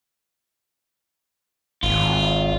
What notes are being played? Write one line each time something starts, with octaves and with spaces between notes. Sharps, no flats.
G#1 F4